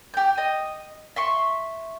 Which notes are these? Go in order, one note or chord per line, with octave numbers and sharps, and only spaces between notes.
G4 G6
D#5
E5 C6 C#6